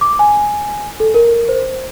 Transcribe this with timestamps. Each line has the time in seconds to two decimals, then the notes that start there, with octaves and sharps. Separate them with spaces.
0.01 D6
0.19 G#5
1.00 A4
1.14 A#4
1.49 C5